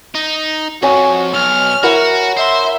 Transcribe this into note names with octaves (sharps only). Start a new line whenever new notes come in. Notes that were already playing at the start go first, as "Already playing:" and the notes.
D#4
F2 F#4 C#5 G#5 C#6
B1 F6
E4 F#4 A#4 F#5
C5 E5 C6